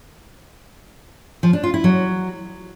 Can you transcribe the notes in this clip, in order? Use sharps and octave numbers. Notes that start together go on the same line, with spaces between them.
F3
D4
F4
E4
F#3